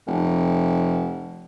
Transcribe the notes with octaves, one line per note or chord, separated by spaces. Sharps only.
F1